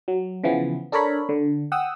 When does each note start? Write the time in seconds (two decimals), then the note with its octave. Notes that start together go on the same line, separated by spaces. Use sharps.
0.08 F#3
0.44 C#3 E3 F3 B3
0.92 D4 A4 A#4 C#5 B5
1.29 D3
1.72 F#5 G5 D#6 E6